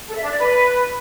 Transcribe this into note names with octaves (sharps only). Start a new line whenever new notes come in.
A4
E5
D4
D5
B4